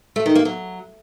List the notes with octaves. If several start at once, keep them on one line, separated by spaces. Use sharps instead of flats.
A3
D#3
A#3
F#3